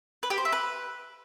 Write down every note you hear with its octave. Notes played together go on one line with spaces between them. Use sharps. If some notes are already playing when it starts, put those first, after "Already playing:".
B4
G4
C5
E5
B4